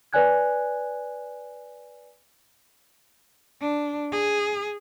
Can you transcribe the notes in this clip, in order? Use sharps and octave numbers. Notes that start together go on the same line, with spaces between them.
B4 C#5 D5 G#5 F#6 G#6
D4
G#4